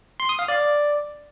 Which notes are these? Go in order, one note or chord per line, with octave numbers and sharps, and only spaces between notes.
C6
D#6
F5
D5